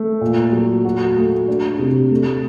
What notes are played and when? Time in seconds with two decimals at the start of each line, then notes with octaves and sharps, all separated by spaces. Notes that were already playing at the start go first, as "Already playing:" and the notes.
Already playing: A3
0.21 A#2
0.53 F#3
0.85 F#4
1.16 A3
1.48 D4
1.79 C3
2.11 A3